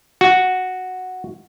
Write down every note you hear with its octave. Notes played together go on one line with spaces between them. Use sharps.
F#4